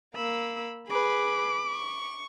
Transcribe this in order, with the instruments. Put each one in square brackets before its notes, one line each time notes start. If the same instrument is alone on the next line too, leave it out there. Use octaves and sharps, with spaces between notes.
[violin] A#3 [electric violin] B5 E6
[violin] G#4 B4 [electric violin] B5 D6
[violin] C#6